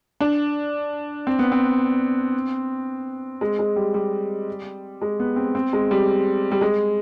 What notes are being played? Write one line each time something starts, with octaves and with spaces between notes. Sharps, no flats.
D4
C4
B3
C4
G#3
G#3
G3
G3
G#3
B3
C4
C4
G#3
G3
G3
G#3